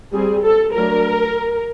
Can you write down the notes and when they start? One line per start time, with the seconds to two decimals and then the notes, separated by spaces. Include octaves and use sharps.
0.12 G3 C4 G#4
0.43 A4
0.75 F#3 A3 D4 A#4